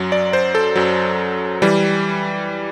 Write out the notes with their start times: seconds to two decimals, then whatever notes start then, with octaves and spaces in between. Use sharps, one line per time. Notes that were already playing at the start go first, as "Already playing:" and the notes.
Already playing: F#2 F#3
0.12 D5
0.33 C5
0.55 A4
0.75 F#2 F#3
1.62 E3 G3